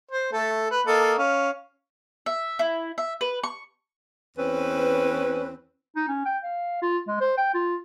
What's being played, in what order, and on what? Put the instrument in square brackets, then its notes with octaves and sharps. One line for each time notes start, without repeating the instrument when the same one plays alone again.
[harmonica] C5
A3 A4
B4
A#3 A4 D#5
C#4 F5
[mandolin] E5
E4
E5
B4
C#6
[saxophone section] E2 C4 C#4 B4
[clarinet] D#4
C#4
G5
F5
F4
G#3
C5
G5
F4